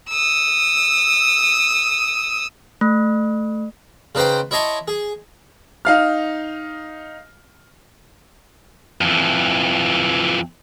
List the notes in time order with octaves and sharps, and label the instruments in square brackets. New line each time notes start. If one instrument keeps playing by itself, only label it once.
[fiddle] D#6 E6
[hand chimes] A3
[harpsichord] C#3 D#4 B4 C5 G5
E4 C#5 D#5 A5 C6
G#4
[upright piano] D#4 F5 F6
[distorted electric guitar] F2 E3